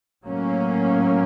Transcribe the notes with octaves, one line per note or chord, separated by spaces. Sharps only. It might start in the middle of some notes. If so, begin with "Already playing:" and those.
A2 F#3 A#3 C#4